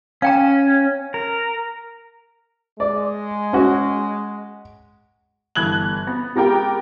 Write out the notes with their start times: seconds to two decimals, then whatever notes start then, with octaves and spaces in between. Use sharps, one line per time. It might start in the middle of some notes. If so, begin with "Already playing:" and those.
0.22 C#4 F5 G5 A#5
1.14 A#4
2.80 G#3 D5
3.53 C#4 F#4
5.55 G1 E3 F#6 G#6 F#7
6.07 B3
6.36 G#3 B3 G4 A#4 G5